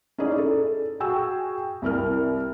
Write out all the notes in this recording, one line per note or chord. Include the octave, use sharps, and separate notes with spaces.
C#4 D#4 E4 G#4 D5
A4
F#4 G#4 G5 G#5 E6
C2 E4 A#4 F6